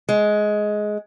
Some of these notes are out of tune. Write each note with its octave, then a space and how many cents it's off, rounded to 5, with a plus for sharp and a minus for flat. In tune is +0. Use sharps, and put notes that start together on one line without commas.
G#3 +15